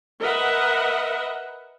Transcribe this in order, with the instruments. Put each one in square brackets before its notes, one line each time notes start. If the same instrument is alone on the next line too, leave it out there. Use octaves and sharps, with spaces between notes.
[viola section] A#4 B4 D#5 E5 F#5